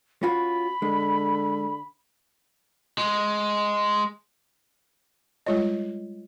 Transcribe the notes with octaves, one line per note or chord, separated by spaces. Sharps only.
C#4 F4 F#4 B5
D3 G#3
G#3
G3 G#3 F4 C#5 D#5